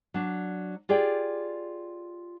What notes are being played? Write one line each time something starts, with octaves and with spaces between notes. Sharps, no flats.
F#3 D4
F4 G4 G#4 D5 G5